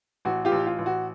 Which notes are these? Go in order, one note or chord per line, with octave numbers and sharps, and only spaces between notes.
A1 F#4
F4 G4
A1
F4
A1
F#4